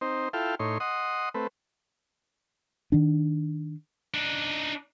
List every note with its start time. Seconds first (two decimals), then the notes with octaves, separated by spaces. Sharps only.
0.01 C4 D#4 C5
0.33 E4 F4 A4 F5 G5
0.59 A2 D#4 C#5 C6
0.80 D#5 F#5 C6 D#6
1.34 A3 C4 B4
2.92 D#3 D4
4.14 D4 D#4